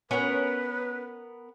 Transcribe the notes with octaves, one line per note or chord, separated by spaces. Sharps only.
B3 C#4 F#4 A#4 B4